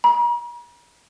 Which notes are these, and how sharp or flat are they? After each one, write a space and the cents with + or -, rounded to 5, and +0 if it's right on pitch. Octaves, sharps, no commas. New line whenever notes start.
A#5 +45